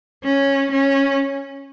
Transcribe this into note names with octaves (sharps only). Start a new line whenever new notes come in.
C#4
C#4